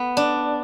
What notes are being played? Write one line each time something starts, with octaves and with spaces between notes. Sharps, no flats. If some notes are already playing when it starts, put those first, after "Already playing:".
Already playing: B3
D4